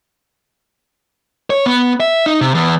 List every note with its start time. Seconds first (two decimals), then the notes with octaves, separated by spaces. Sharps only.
1.50 C#5
1.66 B3
2.00 E5
2.26 D#4
2.41 C3
2.55 E2